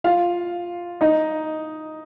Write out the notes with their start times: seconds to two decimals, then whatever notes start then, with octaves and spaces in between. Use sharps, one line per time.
0.04 F4 F5
1.01 D#4 D#5